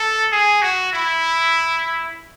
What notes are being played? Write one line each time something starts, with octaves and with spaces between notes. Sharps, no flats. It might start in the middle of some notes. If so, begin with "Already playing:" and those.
Already playing: A4
G#4
F#4
E4